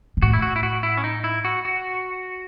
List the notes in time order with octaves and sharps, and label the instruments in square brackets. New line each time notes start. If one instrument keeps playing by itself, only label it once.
[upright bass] B2
[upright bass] A2 [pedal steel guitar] F#4
[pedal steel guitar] E4
F#4
E4
F#4
E4
C#4
D#4
E4
F#4
F#4